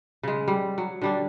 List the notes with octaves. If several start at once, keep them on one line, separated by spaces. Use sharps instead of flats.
C#3 G#3
G3
F#3
D3 G3 D4